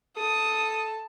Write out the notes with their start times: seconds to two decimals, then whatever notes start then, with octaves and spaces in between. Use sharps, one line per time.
0.17 A4 A5 D#6